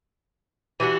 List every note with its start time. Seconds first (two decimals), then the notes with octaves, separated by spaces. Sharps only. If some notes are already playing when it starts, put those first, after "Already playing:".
0.80 E3 G3 D4 F#4